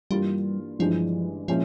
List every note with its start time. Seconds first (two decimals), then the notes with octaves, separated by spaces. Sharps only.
0.11 G2 E3 G3 A#3 F4
0.79 G1 G2 E3 F3 G#3
1.48 A#2 F3 G#3 C#4 E4